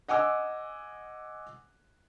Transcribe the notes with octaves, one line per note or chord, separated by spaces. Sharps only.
D#5 F#5 G#5 D6 E6